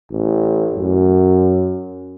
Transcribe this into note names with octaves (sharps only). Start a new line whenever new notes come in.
A1
F#2